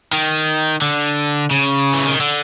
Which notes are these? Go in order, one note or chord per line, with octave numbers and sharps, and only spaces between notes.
D#3
D3
C#3
E3
D#3
D3